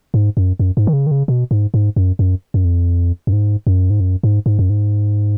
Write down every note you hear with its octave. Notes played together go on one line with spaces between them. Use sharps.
G#2
F#2
F#2
G#2
D#3
C#3
D#3
C#3
B2
G#2
G#2
F#2
F#2
F#2
F2
F#2
G#2
F#2
G#2
F#2
G#2
G#2
F#2
G#2